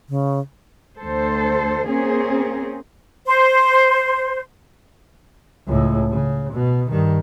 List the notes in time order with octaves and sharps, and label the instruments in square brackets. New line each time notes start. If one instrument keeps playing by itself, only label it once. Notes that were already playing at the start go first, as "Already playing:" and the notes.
[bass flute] C#3
[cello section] D2 A4 C5
A#3 C4 C#4 G#4
[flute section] C5
[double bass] C#2 A2
C#3
B2
G2 D#3